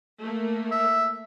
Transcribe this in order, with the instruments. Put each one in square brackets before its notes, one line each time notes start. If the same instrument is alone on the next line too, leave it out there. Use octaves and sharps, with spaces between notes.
[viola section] A3 A#3
[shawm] E5